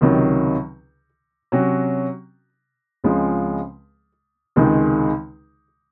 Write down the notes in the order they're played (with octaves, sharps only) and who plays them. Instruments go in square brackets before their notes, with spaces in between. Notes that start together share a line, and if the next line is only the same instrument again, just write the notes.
[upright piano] C#2 C3 D#3 F#3
C3 F#3 C#4 F#4
C#2 C#3 F3 G#3 C4
C#2 C3 D#3 G#3 D#4